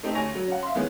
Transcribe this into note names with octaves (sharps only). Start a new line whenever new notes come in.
A3 C4 D#4 G4
D2 C#4 G#5 C#6 A#6 F7
F#3
C#4 F#5
E5 F5 C6
D#3 E3 G#3 B3 C#4